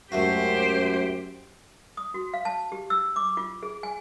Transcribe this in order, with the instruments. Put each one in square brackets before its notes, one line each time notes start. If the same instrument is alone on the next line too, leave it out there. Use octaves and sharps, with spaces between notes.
[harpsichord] C#2 A3 F#4 [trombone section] F#2 [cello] G4 C5
[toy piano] D#6
F#4
F5
A5
G4
E6
D6
F4
G#4
G#5